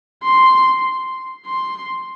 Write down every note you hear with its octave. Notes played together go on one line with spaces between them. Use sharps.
C6
C6